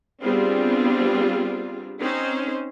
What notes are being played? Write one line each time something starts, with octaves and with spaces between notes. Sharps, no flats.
G3 B3 C4 D4 F4 G#4
C4 C#4 D#4 C5